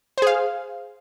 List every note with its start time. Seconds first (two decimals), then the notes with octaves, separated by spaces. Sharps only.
0.18 C5
0.22 G#4
0.27 F5